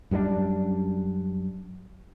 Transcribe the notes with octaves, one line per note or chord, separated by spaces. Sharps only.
F#2 G3 B3 D4